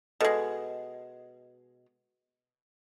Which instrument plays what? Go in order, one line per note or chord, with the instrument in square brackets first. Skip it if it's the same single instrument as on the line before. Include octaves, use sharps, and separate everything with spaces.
[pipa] B2 G#3 [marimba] A4 D#5